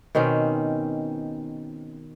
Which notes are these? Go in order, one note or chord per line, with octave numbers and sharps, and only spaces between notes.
B2 D#3 C4 C#4